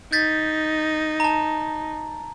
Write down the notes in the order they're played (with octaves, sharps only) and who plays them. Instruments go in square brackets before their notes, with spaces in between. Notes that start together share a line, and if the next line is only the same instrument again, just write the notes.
[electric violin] D#4 [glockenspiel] G6 A6 B6
[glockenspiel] A5 A#5